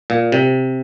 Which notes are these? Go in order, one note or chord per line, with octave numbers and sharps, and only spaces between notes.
A#2
C3